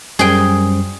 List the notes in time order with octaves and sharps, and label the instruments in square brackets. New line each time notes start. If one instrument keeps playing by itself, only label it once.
[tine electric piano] F#2 G3 C5 [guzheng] G#4 G5